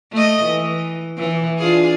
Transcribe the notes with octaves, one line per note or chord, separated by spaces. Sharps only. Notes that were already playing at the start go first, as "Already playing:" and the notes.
A3 D#5
E3
E3
D4 F4 G#4